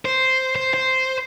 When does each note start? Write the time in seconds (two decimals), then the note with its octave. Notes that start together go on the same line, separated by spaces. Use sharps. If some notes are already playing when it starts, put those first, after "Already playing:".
0.05 C5
0.56 C5
0.74 C5